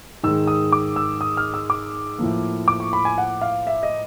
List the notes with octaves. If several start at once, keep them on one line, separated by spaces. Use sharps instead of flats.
G#2 D#3 G#3 E6
D#6
D6
E6
D#6
F6
E6
D6
A2 F3 A#3
D6
C#6
B5
G#5
F#5
F5
E5
D#5